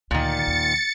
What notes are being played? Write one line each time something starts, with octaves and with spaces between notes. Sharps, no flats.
D2 A#2 D#3 A6 C#7
D#2